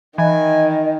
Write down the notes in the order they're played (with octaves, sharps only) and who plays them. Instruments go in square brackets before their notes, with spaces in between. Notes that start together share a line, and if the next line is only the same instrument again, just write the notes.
[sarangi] D#3 [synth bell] E3 [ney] D#5 [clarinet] G#5